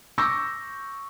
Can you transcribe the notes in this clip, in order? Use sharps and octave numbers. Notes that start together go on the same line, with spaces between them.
C#6 D6 E6 G6 A#6